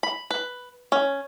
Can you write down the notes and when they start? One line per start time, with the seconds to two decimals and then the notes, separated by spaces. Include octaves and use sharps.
0.03 B5
0.31 B4
0.92 C#4